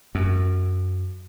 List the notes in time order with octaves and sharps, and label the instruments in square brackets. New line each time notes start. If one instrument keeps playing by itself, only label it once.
[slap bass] F#2